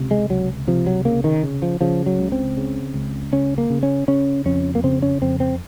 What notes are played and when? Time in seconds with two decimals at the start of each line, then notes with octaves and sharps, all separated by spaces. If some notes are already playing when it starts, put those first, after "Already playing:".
Already playing: C#2 C3
0.11 G#3
0.30 C#2 F#3
0.68 C3 F3
0.87 F#3
1.05 C#3 A#3
1.24 D#3
1.43 C#3
1.62 F3
1.81 C#3 F3
2.06 F#3
2.19 C#2
2.32 C4
2.57 C#3
2.94 C#2
3.32 C#3 C#4
3.58 A#3
3.70 C#3
3.83 C#4
4.08 C#3 C#4
4.46 F2 C#4
4.75 A#3
4.84 C#3 C4
5.02 C#4
5.21 F2 C4
5.40 C4